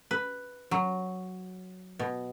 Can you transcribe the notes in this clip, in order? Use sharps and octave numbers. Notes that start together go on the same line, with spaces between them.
B4
F#3
B2